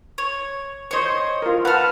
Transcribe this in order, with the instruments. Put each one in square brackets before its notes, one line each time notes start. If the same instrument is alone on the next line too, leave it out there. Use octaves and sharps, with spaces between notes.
[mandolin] C#5
[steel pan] C5 C#6 [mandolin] C#5 D#5
[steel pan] F4 A#4
[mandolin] B4 F6 [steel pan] F#5 A5